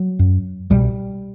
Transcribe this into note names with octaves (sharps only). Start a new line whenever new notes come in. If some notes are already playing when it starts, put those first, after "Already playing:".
Already playing: F#3
F#2
C2 B2 G3